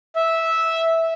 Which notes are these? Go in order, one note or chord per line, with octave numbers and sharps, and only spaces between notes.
E5